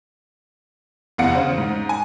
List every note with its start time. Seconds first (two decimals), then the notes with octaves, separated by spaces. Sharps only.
1.18 F1 E2 F5 F#5 C#7
1.35 C#3 C5
1.58 G#2
1.89 G#5